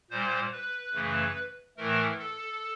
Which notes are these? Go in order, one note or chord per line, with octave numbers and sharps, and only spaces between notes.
A#2 G3 C5
B4
F#2 C#3 E3 A3
A2 E3 A3 A#4
A4